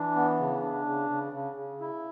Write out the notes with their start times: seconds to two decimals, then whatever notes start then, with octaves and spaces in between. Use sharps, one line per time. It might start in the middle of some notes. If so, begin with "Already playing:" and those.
Already playing: E3 D4
0.16 B3
0.40 C#3
0.62 D4
0.86 C#3
1.10 C#3
1.33 C#3
1.56 C#3
1.80 E4